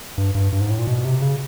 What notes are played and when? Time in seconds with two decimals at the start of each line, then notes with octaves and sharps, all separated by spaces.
0.18 G2
0.35 G2
0.52 G2
0.61 G#2
0.70 A2
0.79 A#2
0.87 B2
1.05 C3
1.22 C#3